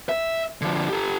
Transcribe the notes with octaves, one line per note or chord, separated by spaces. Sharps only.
E5
D3 F3
G4 A4